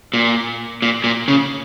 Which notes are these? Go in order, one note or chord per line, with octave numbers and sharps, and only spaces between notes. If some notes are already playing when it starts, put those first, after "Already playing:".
A#2
A#2
A#2
C#3